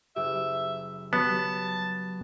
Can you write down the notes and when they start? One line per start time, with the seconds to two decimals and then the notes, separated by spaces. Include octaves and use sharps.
0.16 F#1 G4 E5
1.13 F#3 B3 G4 A5